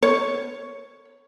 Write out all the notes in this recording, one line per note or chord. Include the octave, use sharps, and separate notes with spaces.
C#5